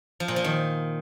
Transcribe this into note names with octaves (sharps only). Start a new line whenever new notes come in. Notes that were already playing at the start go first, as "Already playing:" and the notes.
F3
A#2
F3
D#3